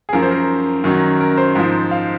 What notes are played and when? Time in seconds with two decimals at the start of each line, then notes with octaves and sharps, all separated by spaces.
0.09 G#4
0.13 F#2 F3 A#4
0.22 C5
0.31 A#4
0.84 F#2 D#3 F#3
1.20 A#4
1.37 C5
1.55 G#2 F3
1.91 F5